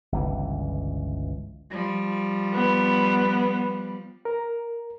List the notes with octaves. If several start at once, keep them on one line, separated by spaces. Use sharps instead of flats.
G1 C#2 E3
F3 G3
B3
A#4